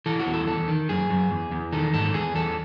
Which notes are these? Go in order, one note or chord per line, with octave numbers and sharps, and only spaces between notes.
E3 A4
F#4
E2
A4
E2 A4
D#3
F#2 G#4
F#2
E2
E2
D#3 A4
G#2 A4
E2 G#4
E2 A4